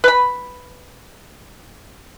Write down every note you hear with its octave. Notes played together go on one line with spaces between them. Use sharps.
B4 B5